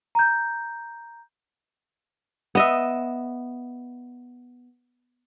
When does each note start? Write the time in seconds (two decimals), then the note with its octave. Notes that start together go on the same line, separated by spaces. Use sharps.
0.15 A#5 G6
2.55 B3 D#5 E5